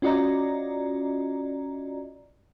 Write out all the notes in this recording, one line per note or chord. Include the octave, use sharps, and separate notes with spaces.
C#4 F4 F#4 D5 D#5 A#5